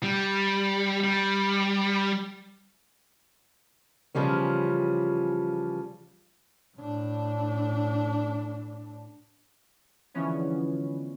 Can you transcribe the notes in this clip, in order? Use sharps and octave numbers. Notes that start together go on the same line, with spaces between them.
G3
G3
E2 C#3 F3 G3 C#4
A2 D4
D3 E3 F3 G#3 B3 C#4